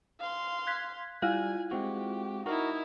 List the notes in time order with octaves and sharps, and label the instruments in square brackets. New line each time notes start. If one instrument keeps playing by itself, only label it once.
[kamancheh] F5 C6
[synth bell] F#6 G#6 B6
[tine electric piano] G3 [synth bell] E4 F4 F5 [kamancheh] G#5
[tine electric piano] G#3 C4 F#4 [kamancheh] G4
[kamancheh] D#4 E4 [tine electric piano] F#4 A#4